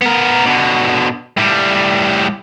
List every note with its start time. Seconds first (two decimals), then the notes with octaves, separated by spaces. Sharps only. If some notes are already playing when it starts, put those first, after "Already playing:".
0.02 B3 A#4
0.46 B2 D3
1.37 A2 G3